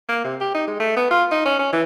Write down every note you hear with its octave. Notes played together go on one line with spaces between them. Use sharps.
A#3
C3
G4
D#4
G#3
A3
B3
F4
D#4
C#4
C#4
E3